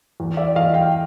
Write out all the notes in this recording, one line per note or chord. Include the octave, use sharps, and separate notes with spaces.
E2
D5 E5
E2 D#5 F5
F5 G5